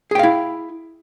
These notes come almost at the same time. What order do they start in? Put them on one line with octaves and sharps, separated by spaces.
G#4 G5 F5 E4